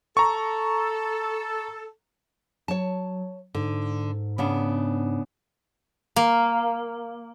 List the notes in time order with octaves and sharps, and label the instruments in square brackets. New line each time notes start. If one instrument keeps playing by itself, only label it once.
[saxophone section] A4 [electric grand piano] A#5 C#6
[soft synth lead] F#3 [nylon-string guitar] C#5 A5
[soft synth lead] G#2 [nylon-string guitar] D3
[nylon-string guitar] C#3 B3 D4
[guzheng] A#3